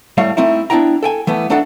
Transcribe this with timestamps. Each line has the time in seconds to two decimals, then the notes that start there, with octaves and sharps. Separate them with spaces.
0.17 A2 G3 A3 C#5 F5
0.37 A3 C4 D#4 E4
0.70 B3 D4 E4 G5 A#5
1.03 A4 G5 G#5
1.27 E3 A3 B3
1.50 A3 D4 D#4 A4 F#5